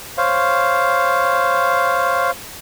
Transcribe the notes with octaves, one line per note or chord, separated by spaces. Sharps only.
C5 C#5 F5